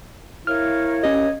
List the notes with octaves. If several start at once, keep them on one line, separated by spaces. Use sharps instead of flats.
E4 A#4 C#5 F5 F6
C#4 G4 D#5